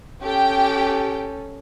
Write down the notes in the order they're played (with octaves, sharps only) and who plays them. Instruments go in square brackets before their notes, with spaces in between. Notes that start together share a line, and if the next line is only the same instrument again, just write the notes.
[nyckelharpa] C#4 A4 [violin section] G4 G5